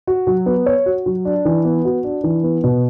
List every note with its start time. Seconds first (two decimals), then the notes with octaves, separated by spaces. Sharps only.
0.07 F#4
0.27 F#3
0.46 B3
0.66 C#5
0.86 F#4
1.06 F#3
1.25 D4
1.45 E3
1.65 B3
1.85 F#4
2.04 D4
2.24 E3
2.43 B3
2.64 B2